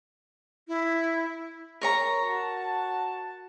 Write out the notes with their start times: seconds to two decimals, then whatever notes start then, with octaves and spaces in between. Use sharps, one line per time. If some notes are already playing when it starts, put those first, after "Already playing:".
0.68 E4
1.81 A#4 C#5 A#5
2.24 F#4 A5